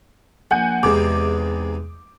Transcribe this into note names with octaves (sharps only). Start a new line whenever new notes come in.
A#1 F#5 G#5 G6
E2 G#2 C3 G#3 D6